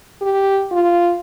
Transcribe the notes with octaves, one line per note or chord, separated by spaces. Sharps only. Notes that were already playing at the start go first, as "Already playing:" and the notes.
G4
F4